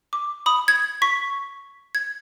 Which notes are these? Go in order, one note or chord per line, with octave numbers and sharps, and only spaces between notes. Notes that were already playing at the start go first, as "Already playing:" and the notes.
D6
B5 D#6
G#6
C#6 B6
G#6